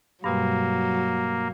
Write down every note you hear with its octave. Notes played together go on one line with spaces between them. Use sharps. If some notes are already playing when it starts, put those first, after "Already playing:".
G2 B2 F#3 G3 A#3